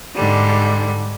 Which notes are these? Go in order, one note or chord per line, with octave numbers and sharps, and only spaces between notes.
G#2 D3 G3